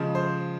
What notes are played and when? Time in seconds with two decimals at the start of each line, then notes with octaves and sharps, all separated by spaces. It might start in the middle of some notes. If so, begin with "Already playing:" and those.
Already playing: C#3 F3 G#3
0.15 C5